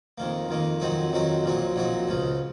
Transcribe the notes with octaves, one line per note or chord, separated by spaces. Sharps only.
F2 D#3 A#3
F2 D#3 A#3
F2 D#3 F#3 C4 D#4
F2 D#3 F#3 C4 D#4
A#1 A#2 F#3 C4 D#4
A#1 A#2 F#3 C4 D#4
C#2 C#3 F3